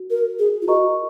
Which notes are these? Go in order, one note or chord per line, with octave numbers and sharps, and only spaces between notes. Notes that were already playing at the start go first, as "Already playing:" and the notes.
Already playing: F#4
A#4
G#4
F4
F#4 A#4 D#5 A#5 C#6